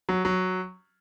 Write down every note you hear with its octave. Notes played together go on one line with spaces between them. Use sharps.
F#3
F#3